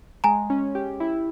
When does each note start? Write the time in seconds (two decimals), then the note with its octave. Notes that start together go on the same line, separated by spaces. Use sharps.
0.24 G#3 G#5 A#5
0.50 C#4
0.75 G4
1.00 E4